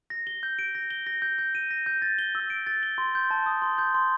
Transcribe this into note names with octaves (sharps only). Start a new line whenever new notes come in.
A#6
G7
G6
D7
A#6
G7
A#6
G6
G6
D#7
A#6
G6
A6
G7
E6
D7
A6
G7
C6
G6
A5
D#6
C6
G6
C6